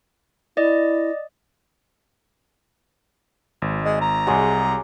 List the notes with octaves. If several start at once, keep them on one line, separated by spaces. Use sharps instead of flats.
E4 D5 D#5
G#1
G#3
A#5
C2 F#3 G#3 G#4 D5 F#5